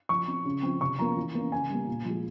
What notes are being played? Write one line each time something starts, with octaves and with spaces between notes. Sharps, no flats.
F3 C#6
C4
C#3
F3 C4
C3 C#6
F3 A#3 C#4 A#5
E3
A#3 C#4
C#3 G#5
G3 A#3
A#2
F3 G#3